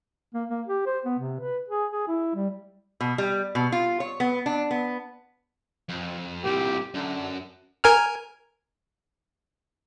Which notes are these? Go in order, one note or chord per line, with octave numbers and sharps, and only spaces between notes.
A#3
A#3
G4
C5
B3
C3
B4
G#4
G#4
E4
G3
B2
G3
B2
F4
C#5
B3
D4
B3
F2
C2 A#2 G4
F#2 D3
A#4 G#5 F6